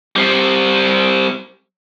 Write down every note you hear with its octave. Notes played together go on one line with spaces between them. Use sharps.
G3 C4